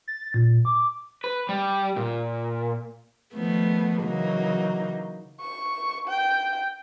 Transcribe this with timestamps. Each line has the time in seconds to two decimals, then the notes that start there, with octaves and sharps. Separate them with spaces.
0.08 A6
0.34 A#2
0.65 D6
1.24 B4
1.49 G3
1.96 A#2
3.33 D#3 F3 A3 B3
4.03 C#3 E3 F#3 A#3 D#4
5.40 C#6
6.08 G5